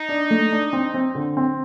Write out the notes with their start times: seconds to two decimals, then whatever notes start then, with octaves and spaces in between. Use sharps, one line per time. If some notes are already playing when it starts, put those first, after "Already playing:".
Already playing: D#4
0.09 D4
0.31 A3
0.52 D4
0.73 C4
0.94 C4
1.15 D3
1.37 C4